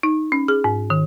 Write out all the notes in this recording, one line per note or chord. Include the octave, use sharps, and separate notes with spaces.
D#4
C#4
G#4
G#2
D#3